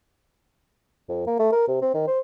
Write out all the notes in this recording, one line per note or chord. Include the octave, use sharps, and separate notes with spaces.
F2
A#3
A3
A#4
C3
C4
D#3
C5